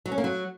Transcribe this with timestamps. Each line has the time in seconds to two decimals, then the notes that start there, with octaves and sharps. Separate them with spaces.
0.06 F#3
0.12 C#4
0.18 A#3
0.24 F#3